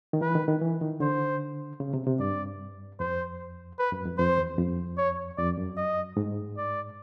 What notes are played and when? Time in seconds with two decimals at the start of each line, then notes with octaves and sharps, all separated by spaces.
0.13 D#3
0.21 E3 B4
0.35 D#3
0.48 D#3
0.61 E3
0.82 D#3
1.00 D3 C5
1.80 C#3
1.94 C3
2.07 C3
2.20 G2 D5
2.99 F2 C5
3.79 B4
3.92 F#2
4.05 F2
4.18 F2 C5
4.38 E2
4.58 F2
4.98 C#5
5.37 F2 D5
5.57 F#2
5.77 D#5
6.17 G#2
6.57 D5